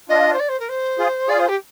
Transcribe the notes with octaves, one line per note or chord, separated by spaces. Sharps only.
D4 F4 D#5
C5
D5
C5
A#4
C5
F4 G#4
F4 G#4 D5
C5
G4